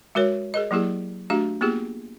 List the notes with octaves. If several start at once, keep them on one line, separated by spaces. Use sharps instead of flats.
G#3 F#4 A#4 C#5
G#4 A#4 D#5
F#3 A#3 E4 G4 G#4
A3 D4 F#4 G4 F5
A#3 B3 F4 G4 G#4